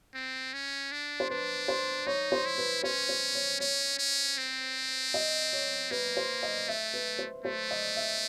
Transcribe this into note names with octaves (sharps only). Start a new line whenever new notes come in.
C4
C#4
D4
C5
D4 B4
C5
D#4 C#5
C5
E4
B4
C#4 C5
C5
C#5
C#4 C#5
C#4
C4
D#5
C#5
A#3 B4
C5
D#5
A3 E5
B4
C5
A3 C5
D#5
E5